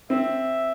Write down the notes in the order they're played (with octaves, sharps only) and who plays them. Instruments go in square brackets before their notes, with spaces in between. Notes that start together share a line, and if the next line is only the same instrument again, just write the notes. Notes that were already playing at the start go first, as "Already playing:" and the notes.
[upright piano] C4 [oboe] E5